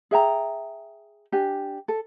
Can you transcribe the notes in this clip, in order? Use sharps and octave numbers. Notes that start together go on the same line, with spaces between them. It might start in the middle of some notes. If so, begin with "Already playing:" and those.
G#4 E5 G5 A#5
D4 G4 G#5
A4